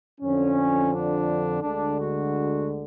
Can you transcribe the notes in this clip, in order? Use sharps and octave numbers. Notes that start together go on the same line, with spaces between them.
F2 D3 F3 C#4
D4
D2 D3 G#3 D4
F#4